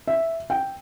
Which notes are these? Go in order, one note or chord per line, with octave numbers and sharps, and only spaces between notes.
E5
G5